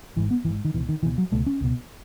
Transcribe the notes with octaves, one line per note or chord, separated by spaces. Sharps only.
G#1 G#2 E3
B3
G#1 E3
G#2
D#3
C#2 B2 E3
D#3
C#2 B2 E3
F#3
C#2 B2 A3
C#4
C#2 B2